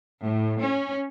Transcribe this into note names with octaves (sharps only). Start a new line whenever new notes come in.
A2
C#4